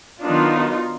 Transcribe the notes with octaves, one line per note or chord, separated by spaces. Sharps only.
D#3 F#3 B3 D4 D#4 F4